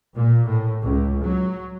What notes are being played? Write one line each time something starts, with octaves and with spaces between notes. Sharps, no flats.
A#2
A2
C#2
F#3